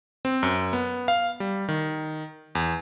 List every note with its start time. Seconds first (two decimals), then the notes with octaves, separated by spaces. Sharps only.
0.25 C4
0.43 F#2
0.73 B3
1.08 F5
1.40 G3
1.68 D#3
2.55 E2